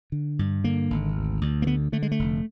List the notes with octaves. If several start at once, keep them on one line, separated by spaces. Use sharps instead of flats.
D3
G2
D3 A#3
G#1
D2
D2
A#3
D3 B3
D3 A3
G#3
A3
F1